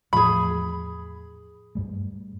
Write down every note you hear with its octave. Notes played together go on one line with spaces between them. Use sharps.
E2 A2 F3 G#4 B5
G2 G3 A3